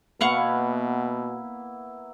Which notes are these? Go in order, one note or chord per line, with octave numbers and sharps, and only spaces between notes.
B2 A#3 B3 E4 F5 F#5 C#6